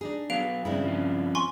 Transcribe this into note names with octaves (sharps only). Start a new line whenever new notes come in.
D4 D#4 G#4
F#3 B3 F5 D7 F7
G2 C#3 G#3 C4 E4
F3 C4 C#4
G#5 C6 C#6